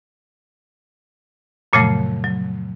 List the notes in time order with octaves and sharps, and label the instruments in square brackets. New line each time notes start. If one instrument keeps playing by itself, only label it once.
[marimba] F#2 A#2 C#3 F3 F#3 A3
F#3